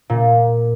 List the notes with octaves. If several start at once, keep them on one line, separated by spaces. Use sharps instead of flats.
A#2